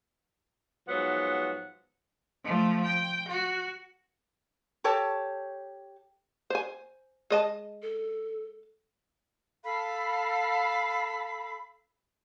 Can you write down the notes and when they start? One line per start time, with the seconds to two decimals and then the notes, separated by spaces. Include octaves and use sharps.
0.88 G#2 F3 F#3 B3 F#5
2.44 F3 A3
2.85 G5
3.29 F#4
4.84 G4 A4 C#5 A5
6.50 C5 G#5
7.30 G#3 D#5 A5
7.82 A4
9.63 A4 F5 B5